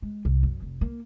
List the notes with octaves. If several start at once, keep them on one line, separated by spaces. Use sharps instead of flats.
G#3
C2
F#2
F1
A#3